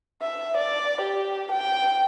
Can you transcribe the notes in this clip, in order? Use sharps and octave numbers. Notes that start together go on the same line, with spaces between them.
E5
D5
G4
G5